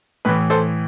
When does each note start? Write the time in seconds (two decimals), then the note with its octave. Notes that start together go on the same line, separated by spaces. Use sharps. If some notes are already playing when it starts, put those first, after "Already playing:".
0.25 A2 E3 B4
0.50 A4 C5